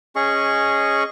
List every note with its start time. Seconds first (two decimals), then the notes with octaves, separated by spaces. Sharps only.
0.16 C#4 G#4 D#5 C#6